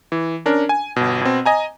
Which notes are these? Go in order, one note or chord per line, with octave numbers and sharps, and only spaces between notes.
E3
C#4 D4 A#4
G#5
G1 B2
B2 C4
D#5 G#5 A#5